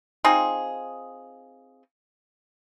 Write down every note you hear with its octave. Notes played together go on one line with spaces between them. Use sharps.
C4 D#4 F4 G#4